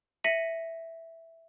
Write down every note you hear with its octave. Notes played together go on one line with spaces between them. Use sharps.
E5 A#6 B6 C#7 D#7 F#7